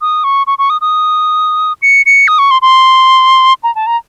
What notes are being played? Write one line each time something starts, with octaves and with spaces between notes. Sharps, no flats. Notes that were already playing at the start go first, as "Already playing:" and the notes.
D#6
C#6
C#6
C#6
D#6
D#6
C#7
C#7
D#6
C#6
C6
C6
A#5
A5
A#5